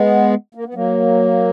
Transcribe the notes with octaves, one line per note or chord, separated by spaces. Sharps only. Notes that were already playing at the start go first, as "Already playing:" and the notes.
Already playing: G#3 B3
A#3
B3
F#3 A#3